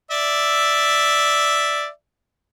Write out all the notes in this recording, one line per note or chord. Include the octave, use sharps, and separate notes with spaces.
D5 E5